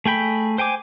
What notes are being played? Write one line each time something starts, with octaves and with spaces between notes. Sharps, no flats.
A3 G#4 G5 B5
C5 G5 G#5 D6